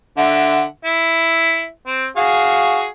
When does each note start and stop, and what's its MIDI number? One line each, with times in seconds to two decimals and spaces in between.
0.18 0.64 50
0.18 0.64 76
0.18 0.64 78
0.85 1.67 64
1.87 2.06 60
2.17 2.87 66
2.17 2.87 68
2.17 2.87 77